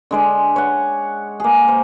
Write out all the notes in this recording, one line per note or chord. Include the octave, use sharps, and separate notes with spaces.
D3 G#3 D5
C#5 F#5
A#3 G#4
C5